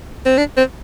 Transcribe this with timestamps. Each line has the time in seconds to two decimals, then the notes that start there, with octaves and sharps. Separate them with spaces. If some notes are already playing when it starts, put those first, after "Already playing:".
0.26 C4
0.38 D4
0.57 C4